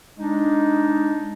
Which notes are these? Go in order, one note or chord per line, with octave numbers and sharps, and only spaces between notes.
G#3 D4 D#4